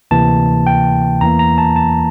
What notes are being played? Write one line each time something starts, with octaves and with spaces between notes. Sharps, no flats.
D2 C3 E3 A#3 A5
G5
E2 E3 A#3 A#5
A#5
A5
A5